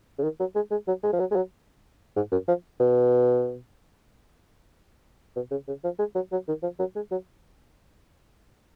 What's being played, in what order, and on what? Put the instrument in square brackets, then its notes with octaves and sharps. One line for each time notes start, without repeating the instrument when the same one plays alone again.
[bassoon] C#3
D#3
F#3
G#3
G#3
F#3
G#3
F3
F#3
G#3
F#3
G#2
F#2
F3
B2
B2
C#3
C#3
F3
G#3
F#3
F#3
D#3
F3
F#3
G#3
F#3